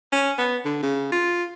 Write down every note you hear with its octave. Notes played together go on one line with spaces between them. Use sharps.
C#4
B3
D3
C#3
F4